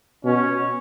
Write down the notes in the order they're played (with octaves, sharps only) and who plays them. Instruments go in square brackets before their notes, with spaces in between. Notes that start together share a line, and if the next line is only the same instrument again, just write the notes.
[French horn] B2 [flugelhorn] C#4